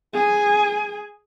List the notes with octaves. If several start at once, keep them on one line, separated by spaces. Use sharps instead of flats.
G#4 G#5